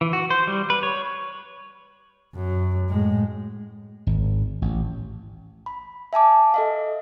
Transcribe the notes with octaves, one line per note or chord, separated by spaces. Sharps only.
E3
F#4
C5
G3
B4
C#5
F#2
A2 G#3
G#1
A1
B5
E5 G#5 A5 D6
A4 D#5 F5